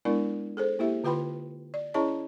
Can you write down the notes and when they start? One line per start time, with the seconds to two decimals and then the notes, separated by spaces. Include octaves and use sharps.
0.05 G#3 B3 D4 E4 A#4 D5
0.57 G#4 A4 C5
0.79 A#3 E4 G4 E5
1.04 D3 F4 B4 G5 B5 C6
1.74 D5
1.94 C#4 E4 G#4 C#5 D#5 A5